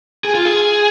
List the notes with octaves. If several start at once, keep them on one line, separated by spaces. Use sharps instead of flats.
G#4
F4
G#4